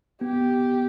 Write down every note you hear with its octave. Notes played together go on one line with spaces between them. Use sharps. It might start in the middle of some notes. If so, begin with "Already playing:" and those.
B3 G4